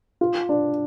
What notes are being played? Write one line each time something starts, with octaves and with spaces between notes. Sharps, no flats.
F4
D4